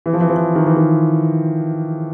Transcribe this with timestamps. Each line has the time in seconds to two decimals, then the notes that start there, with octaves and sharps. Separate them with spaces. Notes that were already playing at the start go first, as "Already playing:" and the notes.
0.06 E3
0.13 F3
0.21 E3
0.29 F3
0.36 E3
0.55 D#3
0.67 E3
0.77 D#3